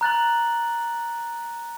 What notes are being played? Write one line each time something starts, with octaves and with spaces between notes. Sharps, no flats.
A#5 F#6 A6 F#7